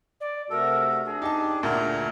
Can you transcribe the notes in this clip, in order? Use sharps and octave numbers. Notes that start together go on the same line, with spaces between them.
D5
C3 A3 F#4 A4 A#4
D4 G#4
D#4 G4 A5
D2 A#2 A3 A#4 A#5